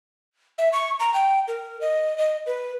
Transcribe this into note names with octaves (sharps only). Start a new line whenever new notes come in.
E5
C#6
A#5
G5
A#4
D#5
D#5
B4